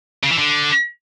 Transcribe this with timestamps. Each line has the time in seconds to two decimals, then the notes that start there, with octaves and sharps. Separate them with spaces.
0.24 C#3
0.31 E3
0.38 D3